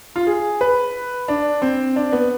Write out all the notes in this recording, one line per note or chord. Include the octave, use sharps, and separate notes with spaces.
F4
G#4
B4
D4
C4
D4
B3